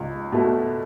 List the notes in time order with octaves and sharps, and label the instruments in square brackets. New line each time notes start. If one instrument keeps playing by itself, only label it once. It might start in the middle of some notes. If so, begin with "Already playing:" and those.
Already playing: [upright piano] C#2
B2 A3